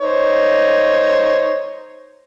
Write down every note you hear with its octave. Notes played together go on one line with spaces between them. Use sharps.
D#4 C5 C#5